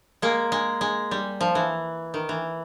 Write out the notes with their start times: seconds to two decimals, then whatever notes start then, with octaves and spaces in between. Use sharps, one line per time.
0.22 G#3 A#3
0.52 G#3
0.81 G#3
1.11 G3
1.41 F3
1.55 E3
2.14 D#3
2.29 E3